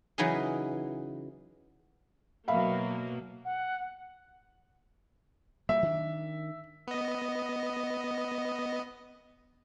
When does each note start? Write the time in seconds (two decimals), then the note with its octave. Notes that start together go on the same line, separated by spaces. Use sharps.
0.18 C#3 E3 F#3 B3 D#4 G#4
2.48 B2 F#3 A#3 E5 F5 B5
3.45 F#5
5.69 G3 A#3 E5
5.83 D#3 D4
6.87 B3 D#5